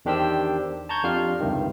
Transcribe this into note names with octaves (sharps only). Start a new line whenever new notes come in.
E2 D#3 D4 G4 C5 E6
A5 A#5 C#6 G6 G#6
F2 D4 F4 G4 F5 F6
C#2 G2 C3 D#3